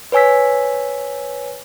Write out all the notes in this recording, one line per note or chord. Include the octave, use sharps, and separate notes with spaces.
B4 C#5 G#5 E6 B6